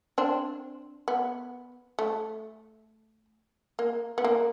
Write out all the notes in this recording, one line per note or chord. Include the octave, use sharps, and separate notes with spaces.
C4 D4
B3
A3
A#3
B3
A#3